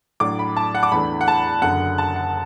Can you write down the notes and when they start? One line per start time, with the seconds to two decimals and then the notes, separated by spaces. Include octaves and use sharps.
0.20 A2 F#3 D4 D6
0.39 B5
0.57 A5
0.75 F#5
0.83 D6
0.92 E2 E3 A3 D4 B5
1.21 F#5
1.28 A5
1.62 F#1 F#2 D3 F#5
1.98 A5
2.16 F#5